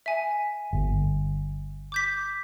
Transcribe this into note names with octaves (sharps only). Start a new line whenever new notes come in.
E5 G#5
G1
D6 G6 B6